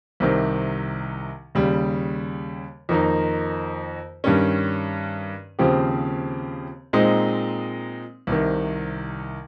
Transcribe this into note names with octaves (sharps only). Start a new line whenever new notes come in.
C2 C3 D#3
D#2 C#3 G3
F2 D#3 A#3 D#4
G2 D#3 G3 C#4
D#2 C#3 F3 C4 G4
A#2 G#3 C4 D#4
C2 C3 D#3